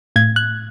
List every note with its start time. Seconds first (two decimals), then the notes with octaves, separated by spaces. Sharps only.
0.16 A2 G#6
0.36 F#6